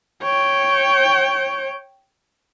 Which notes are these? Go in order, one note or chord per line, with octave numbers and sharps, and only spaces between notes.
C#5 G5